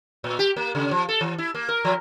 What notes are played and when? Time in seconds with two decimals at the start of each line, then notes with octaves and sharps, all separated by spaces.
0.24 A#2
0.39 G4
0.56 A#3
0.75 C#3
0.91 F3
1.09 A4
1.21 E3
1.38 E4
1.55 A#3
1.69 A#4
1.85 F3